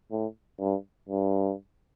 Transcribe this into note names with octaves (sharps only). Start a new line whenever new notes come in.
A2
G2
G2